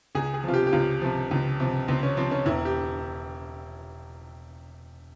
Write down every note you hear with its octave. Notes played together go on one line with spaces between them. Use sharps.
C#2 G#4
G#4
C3 F3 F4
G4
G4
C#2 F4
C3 F3
C#2
C3 F3
C#2 C4
C#4
C3 F3 C4
C#4
E1 E4
G4